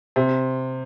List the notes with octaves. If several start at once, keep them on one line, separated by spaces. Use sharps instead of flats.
C3